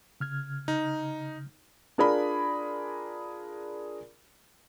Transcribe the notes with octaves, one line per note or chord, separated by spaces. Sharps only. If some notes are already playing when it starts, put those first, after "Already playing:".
C#3 F6 G#6
D#4
D4 F4 G#4 A#4 D5 B5